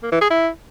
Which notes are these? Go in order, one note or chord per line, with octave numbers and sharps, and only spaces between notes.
A#3
E3
G#4
E4